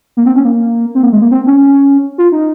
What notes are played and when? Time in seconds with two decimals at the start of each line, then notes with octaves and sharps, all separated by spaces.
0.17 A#3
0.26 C4
0.36 C#4
0.45 A#3
0.95 C4
1.03 A#3
1.12 G#3
1.22 A#3
1.31 C4
1.47 C#4
2.18 F4
2.32 D#4